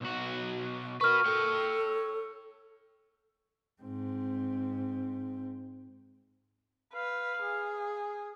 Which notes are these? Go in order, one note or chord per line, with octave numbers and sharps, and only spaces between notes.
B1 F#4
F#4 A#4 B4 C#6 F6
A4 C#5 G5
G#2 C4
B4 F5
G#4